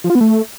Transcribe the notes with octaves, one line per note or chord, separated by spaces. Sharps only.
F3
F4
B3
A3